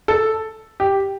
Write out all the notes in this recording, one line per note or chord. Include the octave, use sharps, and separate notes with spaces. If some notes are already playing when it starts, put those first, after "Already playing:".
A4
G4